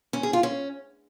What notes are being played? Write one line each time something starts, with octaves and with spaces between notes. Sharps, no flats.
C#4
G#4
F4
C#4